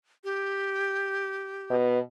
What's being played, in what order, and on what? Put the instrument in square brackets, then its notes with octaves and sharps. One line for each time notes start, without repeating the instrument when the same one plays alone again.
[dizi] G4
[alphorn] B2